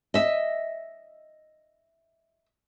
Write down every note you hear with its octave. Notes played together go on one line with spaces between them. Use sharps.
D#5 E5